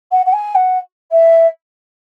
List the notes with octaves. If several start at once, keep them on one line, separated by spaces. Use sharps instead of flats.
F#5
F#5
G#5
F#5
E5